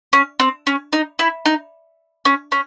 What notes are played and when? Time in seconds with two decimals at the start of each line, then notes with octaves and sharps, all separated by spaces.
0.13 C#4
0.40 C4
0.67 C#4
0.93 D#4
1.19 E4
1.46 D#4
2.25 C#4
2.52 C#4